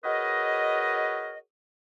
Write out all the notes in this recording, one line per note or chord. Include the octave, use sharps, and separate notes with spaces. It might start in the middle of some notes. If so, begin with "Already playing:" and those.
F#4 G#4 A#4 B4 C#5 D#5